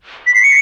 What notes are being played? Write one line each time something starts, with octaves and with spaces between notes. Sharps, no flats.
B6
C7
C#7